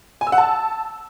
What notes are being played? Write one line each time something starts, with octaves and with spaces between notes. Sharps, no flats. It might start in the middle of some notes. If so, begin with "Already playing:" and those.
G#5
E6
F#5
A5